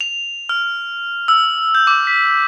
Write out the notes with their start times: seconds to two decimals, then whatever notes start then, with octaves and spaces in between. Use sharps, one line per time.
0.01 F7
0.49 F6
1.28 E6
1.75 G6
1.87 D6
2.07 B6